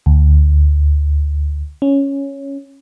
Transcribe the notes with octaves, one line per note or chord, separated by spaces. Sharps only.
D2
C#4